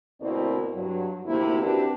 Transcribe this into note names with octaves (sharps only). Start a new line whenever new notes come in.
D2 B2 A#3 C4 E4 D5
G2 F#3
D2 C3 D#3 A#3 E4
C4 D4 F#4 G4 B4